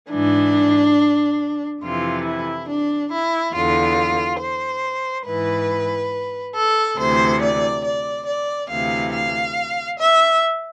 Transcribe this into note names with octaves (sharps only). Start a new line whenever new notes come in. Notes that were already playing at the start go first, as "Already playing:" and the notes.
G#2 E3 D4
F2 C3 E3 F4
E4
D4
E4
E2 D3 F4
C5
G#2 E3 B4
A4
D2 C3 E3 C5
D5
D5
D5
D2 C3 E3 F5
F5
E5